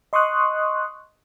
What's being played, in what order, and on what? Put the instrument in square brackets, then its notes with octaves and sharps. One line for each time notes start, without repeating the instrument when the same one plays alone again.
[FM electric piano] D#5 C6 C#6 D#6 F#6